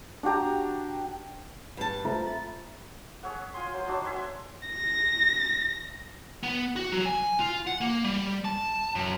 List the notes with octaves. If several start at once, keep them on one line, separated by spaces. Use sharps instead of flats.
D4 F#4 G4 A#5
G2 A5
A3 F4 C5 A#5
B5 A6
G#4 C#5 E5 F#5
F4 G#5 C6
F#3 C5
F#3 D4 D#4 A5
E5 G#5 C6
A#6
B3
F#4
F#3
G#5
F4
F#5
A#3
G3
A5
F#2